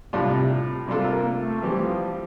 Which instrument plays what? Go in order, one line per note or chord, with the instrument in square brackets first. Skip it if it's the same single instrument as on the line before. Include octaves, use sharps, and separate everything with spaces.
[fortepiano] A2 G3 D4 F4 [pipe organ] C3
[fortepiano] C3 G3 D4 F4 A4 [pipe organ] A#3
[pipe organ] A3
[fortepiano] E3 G3 C4 G4 [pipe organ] F3